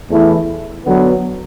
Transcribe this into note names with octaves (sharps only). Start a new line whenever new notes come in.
E2 E3 A3 E4
D3 F#3 B3